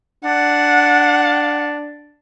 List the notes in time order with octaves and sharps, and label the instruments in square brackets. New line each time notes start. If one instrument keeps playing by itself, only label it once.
[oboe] D4 [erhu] F#5